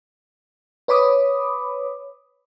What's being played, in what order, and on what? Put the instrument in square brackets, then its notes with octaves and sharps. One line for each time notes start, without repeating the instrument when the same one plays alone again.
[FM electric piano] B4 C#5 B5 D6 D#6